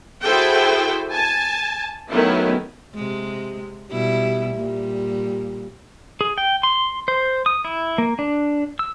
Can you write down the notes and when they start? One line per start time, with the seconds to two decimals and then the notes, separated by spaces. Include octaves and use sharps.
0.22 E4 F#4 G#4 A4 C5 G5
1.11 G#5 A5
2.10 D#3 F#3 A3 B3 C#4 E4
2.95 C3 G#3
3.91 B2 G3 E4
4.55 A#2 G3
6.21 G#4
6.38 G5
6.63 C6
7.08 C5
7.46 D#6
7.65 E4
7.98 A#3
8.19 D4
8.79 E6